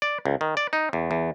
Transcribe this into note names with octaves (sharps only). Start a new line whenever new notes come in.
D5
C#2
D#3
D5
D#4
E2
E2